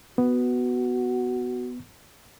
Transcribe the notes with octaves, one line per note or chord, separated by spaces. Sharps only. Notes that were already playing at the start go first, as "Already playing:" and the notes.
B3 F#4